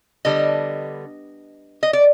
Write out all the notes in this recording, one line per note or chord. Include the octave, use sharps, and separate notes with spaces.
D3 G3 B3 D#5
D#5
D5